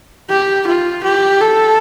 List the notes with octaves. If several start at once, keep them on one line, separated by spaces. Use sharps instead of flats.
G4
F4
G4
A4